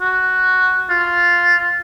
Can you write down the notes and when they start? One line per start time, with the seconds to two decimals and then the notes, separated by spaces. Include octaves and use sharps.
0.01 F#4
0.90 F4